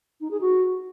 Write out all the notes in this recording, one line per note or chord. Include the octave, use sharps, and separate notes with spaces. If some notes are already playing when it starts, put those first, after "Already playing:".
D#4
G#4
F#4